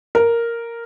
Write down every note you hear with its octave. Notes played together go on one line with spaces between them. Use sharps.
A#4